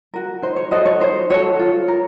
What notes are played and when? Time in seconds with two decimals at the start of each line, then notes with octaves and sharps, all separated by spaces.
0.14 F#4 A#4
0.42 D#4 C5
0.56 C#5
0.71 F#4 A4 C5 D#5
0.85 C#5
1.00 D#4 C5
1.30 F#4 A4 C#5
1.59 F4
1.88 A#4